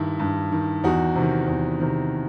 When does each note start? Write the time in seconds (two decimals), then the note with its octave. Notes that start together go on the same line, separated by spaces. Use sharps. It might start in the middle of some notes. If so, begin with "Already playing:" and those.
Already playing: G2 D#3 E4
0.20 G2
0.52 D#3
0.84 E2 D#4 F#4
1.16 C3 D#3
1.47 E2
1.80 C3 D#3